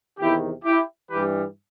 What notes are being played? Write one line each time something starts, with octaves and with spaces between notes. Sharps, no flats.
E2 C3 D#3 E4 G4
E4 G4
G2 E3 G3 G4 B4